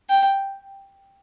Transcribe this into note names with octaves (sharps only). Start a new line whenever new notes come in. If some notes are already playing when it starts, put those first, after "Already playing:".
G5